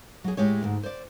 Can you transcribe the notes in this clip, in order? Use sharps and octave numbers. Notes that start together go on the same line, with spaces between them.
F#3 G#4
A2 G#3 G4 C#5
D2 G#2
C5 D5